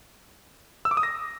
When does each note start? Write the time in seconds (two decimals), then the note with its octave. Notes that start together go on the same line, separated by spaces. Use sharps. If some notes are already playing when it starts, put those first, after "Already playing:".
0.85 E6
0.91 D6
0.97 D#6
1.03 A#6